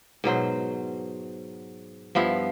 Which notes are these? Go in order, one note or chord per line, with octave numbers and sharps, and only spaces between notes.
G#2 B2 F#3 C5
G2 F3 B3 E4